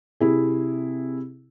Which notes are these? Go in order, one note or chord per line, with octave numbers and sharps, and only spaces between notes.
C3 E4 G#4